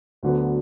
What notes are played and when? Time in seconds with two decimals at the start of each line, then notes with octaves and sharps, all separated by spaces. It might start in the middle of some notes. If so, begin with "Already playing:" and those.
0.23 D2 D3 F#3 B3